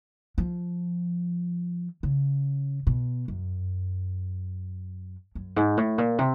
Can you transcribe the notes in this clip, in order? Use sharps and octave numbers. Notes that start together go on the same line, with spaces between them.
F3
C#3
B2
F#2
F#2
G#2
A2
A#2
C3